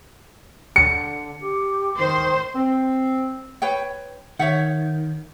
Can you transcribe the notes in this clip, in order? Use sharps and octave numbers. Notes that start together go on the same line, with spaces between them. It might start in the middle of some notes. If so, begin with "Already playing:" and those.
D3 C#7
G4
D#3 C5
C4
B4 C#5 G5
D#3 C#5 E5 F#5